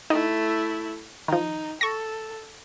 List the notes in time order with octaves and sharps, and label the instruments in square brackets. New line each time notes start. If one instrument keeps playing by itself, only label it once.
[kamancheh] A3 E4 [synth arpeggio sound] D#4
[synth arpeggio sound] D#3 F3 [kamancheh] D#4
[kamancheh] A4 [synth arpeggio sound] C#6 A#6